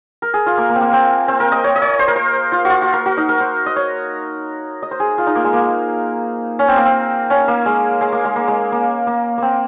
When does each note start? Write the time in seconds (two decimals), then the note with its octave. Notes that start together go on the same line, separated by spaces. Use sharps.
0.22 A#4
0.34 G#4
0.46 F4
0.57 A#3
0.69 A#3
0.76 C4
0.81 A#3
0.93 C4
1.28 C4
1.40 A#4
1.52 D#5
1.64 C#5
1.76 D#5
1.82 C#5
1.99 C5
2.08 A#4
2.16 C5
2.52 F4
2.65 F#4
2.70 F4
2.82 F#4
2.93 A#4
3.06 F#4
3.17 D#4
3.29 A#4
3.41 C5
3.66 D#5
3.76 C#5
4.82 D#5
4.91 C5
5.00 G#4
5.18 F4
5.27 D#4
5.35 A#3
5.44 G#3
5.53 A#3
6.59 C#4
6.68 C4
6.77 A#3
6.85 C4
7.30 C#4
7.48 A#3
7.66 G#3
8.01 G#3
8.12 A#3
8.25 G#3
8.36 A#3
8.48 G#3
8.72 A#3
9.07 A#3
9.38 A#3 C4